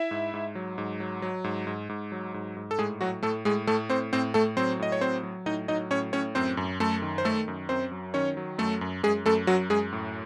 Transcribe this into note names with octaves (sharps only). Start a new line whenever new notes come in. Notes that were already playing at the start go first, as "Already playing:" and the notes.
Already playing: E4 E5
G#2
G#2
F#3
G#2
F#3
F#3
G#2
G#2
G#2
F#3
G#2
G#2
A4
A2 G#3 G#4
A2 F#3 F#4
A2 A3 A4
A2 G#3 G#4
A2 A3 A4
A2 C4 C5
A2 C4 C5
A2 A3 A4
F#3 C4 C5
A2 D#5
C#5
F#3 C4 C5
F#3
A2 D#4 D#5
F#3 D#4 D#5
A2 C#4 C#5
A2 C#4 C#5
F#2 C4 C5
F#2
F#2 A3 A4
D#3
C5
D#3 A3 A4
F#2
F#2 C4 C5
F#3
D#3 C#4 C#5
F#3
F#2 A3 A4
F#2
F#2 G#3 G#4
F#2 A3 A4
F#2 F#3 F#4
F#2 G#3 G#4
A2